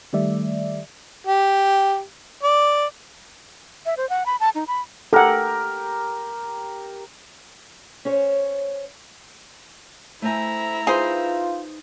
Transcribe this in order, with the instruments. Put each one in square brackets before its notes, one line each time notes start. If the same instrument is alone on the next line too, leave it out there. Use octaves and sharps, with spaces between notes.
[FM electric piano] D#3 G3 A3 D5 E5
[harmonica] G4
D5
[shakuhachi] E5
C5
F#5
B5
A5
D#4
B5
[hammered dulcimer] G4 A#4 [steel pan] A4 F#5
[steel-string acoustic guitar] C#4 C5 C#5
[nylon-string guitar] A3 C5 G#5 [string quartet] E4 E5 A#5
[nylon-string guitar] D#4 B4 F5 [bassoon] F4 [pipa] G#4 C5